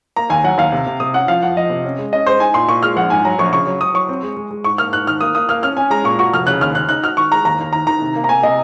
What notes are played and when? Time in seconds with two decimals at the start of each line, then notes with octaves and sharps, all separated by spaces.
0.16 A#3 A#5
0.30 D#2 G#5
0.44 F#3 F#5
0.58 D#2 F5
0.72 C3
0.87 C3
1.00 C3 D#6
1.14 C#4 F#5
1.28 F3 F5
1.42 F2 F#5
1.57 F3 D#5
1.70 C3
1.85 C#4
1.99 G#3
2.13 C#4 D#5
2.26 G#3 C5
2.40 D#4 G#5
2.54 A#2 C6
2.68 A#2 C#6
2.83 G#3 F6
2.96 A#1 F#5
3.10 G#2 G#5
3.25 F#3 A#5
3.39 A#1 C#6
3.52 C#3 C#6
3.67 F#3
3.81 F#3 D#6
3.94 F#3 C#6
4.09 C4
4.23 G#3
4.37 G#3
4.51 G#3
4.64 G#2 C#6
4.78 A#3 F6
4.93 G#2 F#6
5.07 D#3 F6
5.21 A#3 D#6
5.35 A#3 D#6
5.49 A#3 F6
5.63 C#4 F6
5.77 C#4 G#5
5.90 G#3 A#5
6.04 A#2 C#6
6.19 F#4 C#6
6.33 F1 F6
6.47 C#3 F#6
6.61 D#2 F6
6.75 C#3 F#6
6.89 D#4 F#6
7.03 F#4 F6
7.17 D#3 C#6
7.31 G#3 A#5
7.45 D#2 A#5
7.60 D#2
7.72 D#3 A#5
7.87 D#3 A#5
8.02 C3
8.16 A#3
8.24 A#5
8.29 C3 G#5
8.43 C3 D#5